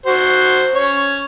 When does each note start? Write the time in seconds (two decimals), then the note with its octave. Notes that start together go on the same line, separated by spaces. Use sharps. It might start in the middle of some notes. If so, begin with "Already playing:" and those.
0.06 F#4 C5
0.75 C#4 C#5